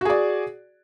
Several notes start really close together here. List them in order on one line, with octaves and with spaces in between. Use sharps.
F#4 G#4 D5